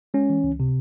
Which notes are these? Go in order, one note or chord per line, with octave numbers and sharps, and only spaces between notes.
G#3 C#4
E3
C#2
C3